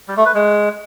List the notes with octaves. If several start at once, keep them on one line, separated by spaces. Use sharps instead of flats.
G3
A3
B4
G#3